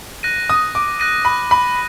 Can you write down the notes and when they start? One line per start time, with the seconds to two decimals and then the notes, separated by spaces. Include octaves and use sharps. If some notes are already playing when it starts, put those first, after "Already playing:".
0.23 F#6 A#6 D#7
0.50 D#6
0.75 D6
1.00 F#6 A#6 D#7
1.25 B5
1.51 B5